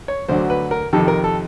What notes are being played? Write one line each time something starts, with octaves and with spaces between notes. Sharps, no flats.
C#5
D2 D3 F#3 C5
B4
A#4
F2 C3 D#3 A4
A#4
A4